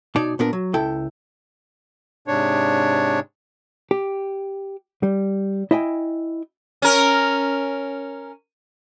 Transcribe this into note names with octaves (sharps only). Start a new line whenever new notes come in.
B2 D#4 C#5 D5 A5
A#2 B3 D4 A#4
F#3
C#2 E4 A4 G5
G#2 C3 D4 C#5
G4
G3
E4 D#5 G5 G#5
C#4 A#4